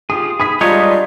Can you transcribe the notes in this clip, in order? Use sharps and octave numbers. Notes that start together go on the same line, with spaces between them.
F4 G4 G#4 D#6
G#4 B5 D#6 B6
G3 G#3 D4 D#4 F4 B4 C#5